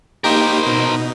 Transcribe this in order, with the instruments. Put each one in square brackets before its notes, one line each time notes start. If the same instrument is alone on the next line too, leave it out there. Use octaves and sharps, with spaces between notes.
[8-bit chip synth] A#3 D#4 G4 [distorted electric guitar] A#4 C5
[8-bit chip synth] B2 D#4